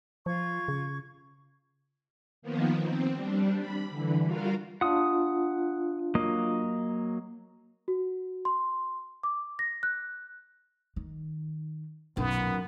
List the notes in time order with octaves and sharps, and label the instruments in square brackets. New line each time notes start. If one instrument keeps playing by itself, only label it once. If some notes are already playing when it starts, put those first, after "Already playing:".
[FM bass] F3 [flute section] F4 C#6 G#6
[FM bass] C#3
[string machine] D#3 F3 A#3 B3
C4
G3 D4
B5
D3 E3
G3 F4 F#4 A#4 F5
[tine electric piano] D4 F4 [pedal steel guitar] F#5 D#6
[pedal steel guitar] F#3 A#3 D#5
[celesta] F#4
C6
D6
A#6
F#6
[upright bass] D#3
[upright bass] B1 [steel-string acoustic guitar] F#2 A#2 D#3 [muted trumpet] B3